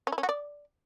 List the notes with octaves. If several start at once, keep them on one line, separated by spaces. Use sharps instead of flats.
C#4
E4
C#4
F#4
D5